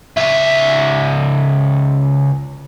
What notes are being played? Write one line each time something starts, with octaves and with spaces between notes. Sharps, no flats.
C#2 E5